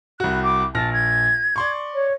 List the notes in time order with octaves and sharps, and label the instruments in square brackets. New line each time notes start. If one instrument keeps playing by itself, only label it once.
[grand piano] C2 F#4 [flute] F#6
[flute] D6
[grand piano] A#1 F6 A#6 [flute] A5
[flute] G#6
[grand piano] D5 C6 C#6
[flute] C#5